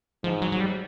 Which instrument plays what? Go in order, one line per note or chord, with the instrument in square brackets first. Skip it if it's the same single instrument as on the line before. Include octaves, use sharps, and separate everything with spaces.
[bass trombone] G#2 [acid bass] F3
[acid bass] F#3
F#3
G3